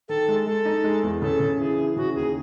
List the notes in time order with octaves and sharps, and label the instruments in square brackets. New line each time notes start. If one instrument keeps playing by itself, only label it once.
[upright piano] D#3 [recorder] A4
[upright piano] G#3
[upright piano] G#3 [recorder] A4
[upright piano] D#4
G#3
E2
[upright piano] C#3 [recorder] A4
[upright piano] C#3
[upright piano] E3 [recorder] G#4
[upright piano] E3
[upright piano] C#3 [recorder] F#4
[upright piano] D#2 [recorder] G#4